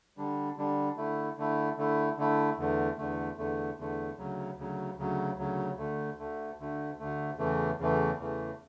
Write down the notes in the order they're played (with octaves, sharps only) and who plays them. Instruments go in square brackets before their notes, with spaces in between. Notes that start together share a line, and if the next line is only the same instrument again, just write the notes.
[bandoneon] D3 G3 D4
D3 G3 D4
D3 A3 E4
D3 A3 E4
D3 A3 E4
D3 A3 E4
E2 D3 A3
E2 D3 A3
E2 D3 A3
E2 D3 A3
D2 C#3 F#3
D2 C#3 F#3
D2 C#3 F#3
D2 C#3 F#3
D2 D3 A3
D2 D3 A3
D2 D3 A3
D2 D3 A3
E2 C#3 E3 A3
E2 C#3 E3 A3
E2 C#3 E3 A3